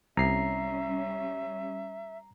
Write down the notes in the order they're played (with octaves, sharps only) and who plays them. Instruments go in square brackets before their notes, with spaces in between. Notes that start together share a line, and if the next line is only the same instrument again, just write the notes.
[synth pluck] C2 [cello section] G3 C#4 [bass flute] E5 [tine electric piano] A#5 C7